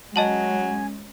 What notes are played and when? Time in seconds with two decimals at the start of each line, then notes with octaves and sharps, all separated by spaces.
0.16 F#3 G#3 C#4 D#5 G#5 A5 F#7